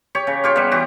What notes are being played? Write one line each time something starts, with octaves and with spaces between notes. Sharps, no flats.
G4 C#5
C#3
F4 G4 C#5
G3 B3
E3 F#4 G4